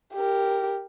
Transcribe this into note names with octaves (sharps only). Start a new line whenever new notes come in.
G4 A#4